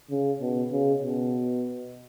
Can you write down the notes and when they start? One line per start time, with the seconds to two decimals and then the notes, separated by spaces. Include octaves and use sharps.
0.11 C#3
0.41 B2
0.71 C#3
1.03 B2